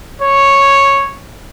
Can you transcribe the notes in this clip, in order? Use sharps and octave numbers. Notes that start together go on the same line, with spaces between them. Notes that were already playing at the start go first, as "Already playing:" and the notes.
C#5